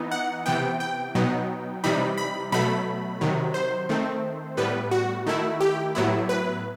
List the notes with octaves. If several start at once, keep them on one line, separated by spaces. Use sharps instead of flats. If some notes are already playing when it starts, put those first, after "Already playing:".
Already playing: E3 B3 D#4
F#5
C3 E3 B3 G5
G5
B2 F#3 B3 D#4
C3 E3 G3 D#4 B5
B5
B2 F#3 A3 B5
C3 D#3 F#3
C5
D#3 A3 C4
A2 G3 B3 B4
F#4
D#3 A3 E4
G4
A2 F#3 B3 E4
B4